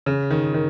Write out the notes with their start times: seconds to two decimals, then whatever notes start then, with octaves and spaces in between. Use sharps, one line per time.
0.06 C#3
0.31 D#3
0.54 D#3